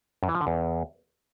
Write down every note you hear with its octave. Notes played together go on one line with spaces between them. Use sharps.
F#2
E3
F3
D3
E2